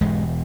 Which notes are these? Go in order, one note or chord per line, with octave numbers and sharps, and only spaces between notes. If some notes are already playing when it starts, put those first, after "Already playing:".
E1 E2 G#2 B2 G#3